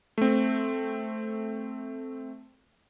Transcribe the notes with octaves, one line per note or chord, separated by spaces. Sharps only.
A3 C4